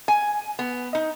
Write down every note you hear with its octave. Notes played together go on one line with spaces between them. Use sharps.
G#5
B3
D#4